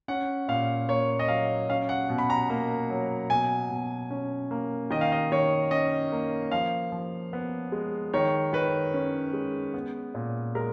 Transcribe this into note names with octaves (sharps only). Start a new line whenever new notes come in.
C#4 F#5
A#2 F5
A#3 C#5
D#5
F#3 F5
C#4 F5
F#5
B2
B5
A#5
A#3
F#3
B2 G#5
B2
C#4
A#3
D#3 D#5
F5
D#5
D#3 C#5
C#4 D#5
A#3
F3 F5
F3
B3
G#3
D#3 C#5
D#3 B4
C#4
G#3
B3
A#2
G#3 A#4